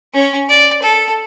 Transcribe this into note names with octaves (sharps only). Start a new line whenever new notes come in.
C#4 C#5
D5
A4